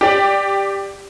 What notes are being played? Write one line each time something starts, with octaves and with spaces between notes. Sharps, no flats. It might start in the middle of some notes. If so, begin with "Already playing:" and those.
G4 D5